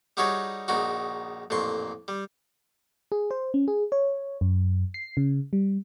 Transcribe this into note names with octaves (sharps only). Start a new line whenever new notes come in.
G3 D#4 F#4 G#4 B4 C#5
A#1 C#3 D#4 F#4
A1 F2 A#2 C6 C#6
G3
G#4
C5
C#4
G#4
C#5
F#2
C7
C#3
G3